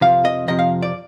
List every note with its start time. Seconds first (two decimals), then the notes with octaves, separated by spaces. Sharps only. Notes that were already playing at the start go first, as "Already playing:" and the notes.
0.01 F2 C3 F3 F5
0.25 D#5
0.48 F2 C3 F3 D#5
0.59 F5
0.83 D5